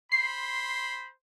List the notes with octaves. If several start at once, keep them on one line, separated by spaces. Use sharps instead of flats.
C5 B5 C6 C7